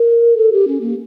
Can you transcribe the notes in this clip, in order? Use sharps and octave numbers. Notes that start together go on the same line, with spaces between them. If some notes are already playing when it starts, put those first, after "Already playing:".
Already playing: A#4
A4
G4
C#4
A#3